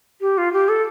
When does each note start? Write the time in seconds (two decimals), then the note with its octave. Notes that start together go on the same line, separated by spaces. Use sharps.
0.21 G4
0.38 F4
0.53 G4
0.69 A4